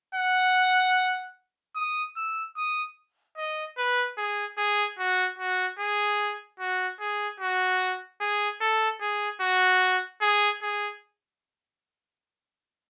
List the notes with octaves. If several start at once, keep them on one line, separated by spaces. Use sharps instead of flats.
F#5
D#6
E6
D#6
D#5
B4
G#4
G#4
F#4
F#4
G#4
F#4
G#4
F#4
G#4
A4
G#4
F#4
G#4
G#4